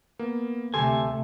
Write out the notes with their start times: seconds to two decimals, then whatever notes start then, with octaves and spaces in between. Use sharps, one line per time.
0.19 A#3 B3
0.74 D2 C3 A3 G4 A4 G#5 C6